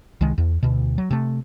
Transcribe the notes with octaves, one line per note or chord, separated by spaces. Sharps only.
C2 D#3 G#3
E2
D2 B2
F#3
C3 A3